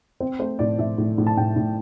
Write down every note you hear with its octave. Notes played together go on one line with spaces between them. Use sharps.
C4 C5
A3 C5
A2 D5
A2 E5
A2
A2
A5
A2 G5
A2